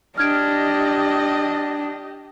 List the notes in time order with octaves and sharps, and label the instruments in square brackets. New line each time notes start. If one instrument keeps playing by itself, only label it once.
[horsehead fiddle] D4 [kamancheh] G4 D#5 [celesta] F6 G#6 D7